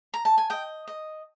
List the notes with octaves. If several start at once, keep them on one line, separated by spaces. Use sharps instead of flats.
A#5
A5
G#5
D#5 G5
D#5